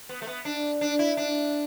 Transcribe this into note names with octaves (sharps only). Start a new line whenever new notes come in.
B3
A3
B3
D4
D4
E4
D4